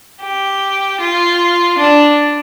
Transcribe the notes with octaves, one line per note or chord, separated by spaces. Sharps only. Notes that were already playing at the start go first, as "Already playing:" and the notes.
G4
F4
D4